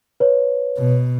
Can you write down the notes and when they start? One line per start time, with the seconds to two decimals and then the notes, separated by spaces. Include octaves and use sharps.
0.20 B4 C#5
0.77 B2